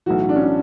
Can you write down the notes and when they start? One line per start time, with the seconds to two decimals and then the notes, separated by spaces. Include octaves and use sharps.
0.06 B1 A2 E3 F#4
0.29 D4
0.36 C#4
0.44 D4